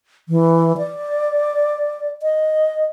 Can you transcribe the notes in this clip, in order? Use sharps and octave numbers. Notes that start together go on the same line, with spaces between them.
E3
D5
D#5